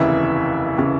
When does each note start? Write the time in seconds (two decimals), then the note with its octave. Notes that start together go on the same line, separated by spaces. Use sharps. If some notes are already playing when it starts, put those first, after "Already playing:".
Already playing: F1 D#2 C#3 E3 E5
0.78 C#3 E3